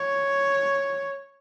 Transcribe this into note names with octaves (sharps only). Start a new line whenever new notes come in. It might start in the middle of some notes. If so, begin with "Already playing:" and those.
Already playing: C#5